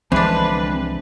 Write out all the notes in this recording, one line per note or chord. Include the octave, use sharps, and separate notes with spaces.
C2 D3 E3 F3 G#3 C4 D4 B4